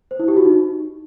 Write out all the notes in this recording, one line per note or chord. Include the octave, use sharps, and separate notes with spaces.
C5
E4
G4
F#4
D#4